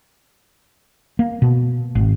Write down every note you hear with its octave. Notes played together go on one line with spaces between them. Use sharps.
A#3
B2
G#1